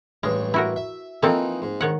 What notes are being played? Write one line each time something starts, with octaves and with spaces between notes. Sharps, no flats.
A1 G2 G#3 C#5
E4 F#4 A#4
E5
E3 F3 A#3 C4 D#4 A4
G#2
D#3 C#5 F#5